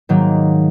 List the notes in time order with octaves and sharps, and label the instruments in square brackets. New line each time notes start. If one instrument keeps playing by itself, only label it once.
[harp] G#2 D#3 F#3 A#3